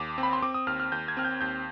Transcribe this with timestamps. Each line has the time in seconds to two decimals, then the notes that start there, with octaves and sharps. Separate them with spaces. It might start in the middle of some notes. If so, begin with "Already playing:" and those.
Already playing: D#2 D6
0.18 C4
0.23 B5
0.33 C6
0.42 C4 D6
0.54 D#6
0.67 D#2 F6
0.80 F6
0.92 D#2 G6
1.08 G#6
1.17 C4 F6
1.25 G6
1.41 D#2 G6